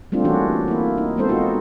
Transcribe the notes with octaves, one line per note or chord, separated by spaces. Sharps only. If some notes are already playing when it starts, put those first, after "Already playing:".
G3 A3 C4 D4 F4
E3 G3 A#3 C#4 D4 F#4
A#3 E4
D#4
G#3 B3 C4 A4 C5
B3 D#4 F4 F#4